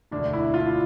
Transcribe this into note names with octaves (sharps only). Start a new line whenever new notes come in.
E1 D2 D3 D4
E4
F4